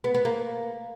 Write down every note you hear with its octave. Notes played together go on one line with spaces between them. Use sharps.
B3
B3
A#3